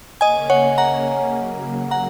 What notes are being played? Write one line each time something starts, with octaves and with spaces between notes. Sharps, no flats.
C#3 A#3 C#4 D#5 G#5
C#5 F#5
F#5 A#5
C#3 F#3 A#3
F#5 A#5